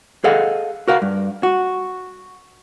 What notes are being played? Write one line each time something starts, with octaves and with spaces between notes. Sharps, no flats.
G#4 A4 D#5 F5 F#5
F#4 A#4 F5 F#5
G2
F#4